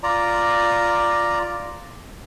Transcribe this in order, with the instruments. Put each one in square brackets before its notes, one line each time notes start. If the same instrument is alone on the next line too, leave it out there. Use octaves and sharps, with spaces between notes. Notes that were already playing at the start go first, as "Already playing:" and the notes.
[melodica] F4 D5 A#5